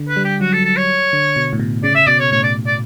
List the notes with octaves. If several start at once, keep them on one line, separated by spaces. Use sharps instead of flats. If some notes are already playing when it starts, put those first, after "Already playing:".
Already playing: D3
B4
G3
G4
F#3 F#4
A4
A4
C#5
D3
B2
A2
B2
C#3 D5
E5
B2 D5
C#5
A2 C#5
D5
D5